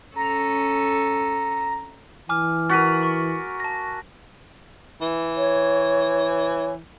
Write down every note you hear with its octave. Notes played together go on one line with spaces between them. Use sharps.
C#4 A4 A#5
E3 G#5 D6 F6
F#4 A#4 A6 B6 D#7
C#6
A5 A#6
E3
C#5